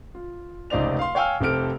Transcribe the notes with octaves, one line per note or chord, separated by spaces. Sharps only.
F4
F1 C#2 D#4 C5 D5 F7
F5 C6
C#5 F5 G5 G#5 E6 F6
F1 C4 G4 A4 F6 D7